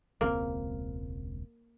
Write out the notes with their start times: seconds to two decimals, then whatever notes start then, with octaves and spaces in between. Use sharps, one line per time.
0.21 E1 C#2 A#3 C4